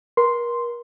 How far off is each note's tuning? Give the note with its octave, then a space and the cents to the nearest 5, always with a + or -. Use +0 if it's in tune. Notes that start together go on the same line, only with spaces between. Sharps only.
A#4 +35 C6 +0